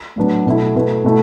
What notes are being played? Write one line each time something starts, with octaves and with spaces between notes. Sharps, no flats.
A2 F#3 B3 D4
B2 A3 E4
B2 A3 E4 B4
B2 A3 E4